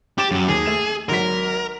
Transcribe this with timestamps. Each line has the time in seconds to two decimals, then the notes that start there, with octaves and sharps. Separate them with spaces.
0.18 G4 D6 A6 E7
0.31 F#2 F#3
0.48 D#2 G#4
0.66 A3 E7
1.09 G#1 F#3 A#4 B6